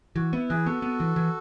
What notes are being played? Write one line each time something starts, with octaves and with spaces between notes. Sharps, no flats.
E3 F#4
B3 E4
E3 G#4 B4
B3 F#4 A4
B3
E3
E3